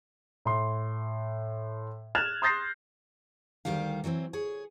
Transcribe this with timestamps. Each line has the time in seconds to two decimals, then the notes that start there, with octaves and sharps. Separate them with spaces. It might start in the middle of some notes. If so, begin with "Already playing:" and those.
0.45 A2 C6
2.15 F6 F#6 G#6 A6 E7 F7
2.42 C6 D#6 G6 A6 A#6 C7
3.65 D2 A#2 D#3 G3 G4 F5
4.04 E3 F#3 A#3 C4
4.33 G#4 C#5